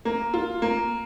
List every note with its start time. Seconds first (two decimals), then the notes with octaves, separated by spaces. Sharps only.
0.05 A#3
0.34 F4
0.62 A#3